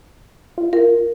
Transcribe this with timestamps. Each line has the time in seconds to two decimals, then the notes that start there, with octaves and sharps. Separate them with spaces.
0.58 F4
0.73 F4 A#4